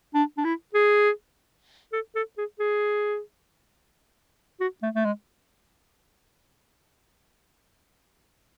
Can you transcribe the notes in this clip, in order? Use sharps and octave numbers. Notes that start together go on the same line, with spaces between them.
D4
D4
E4
G#4
A4
A4
G#4
G#4
F#4
A3
A3
G#3